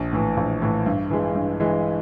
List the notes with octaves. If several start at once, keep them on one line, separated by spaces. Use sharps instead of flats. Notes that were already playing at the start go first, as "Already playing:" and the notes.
Already playing: A#1
A2 E3
A#1
A2 E3
G2
E3 G#3
G2
E3 G#3